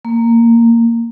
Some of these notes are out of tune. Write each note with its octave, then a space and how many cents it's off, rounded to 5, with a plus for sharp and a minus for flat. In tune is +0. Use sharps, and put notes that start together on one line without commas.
A#3 -10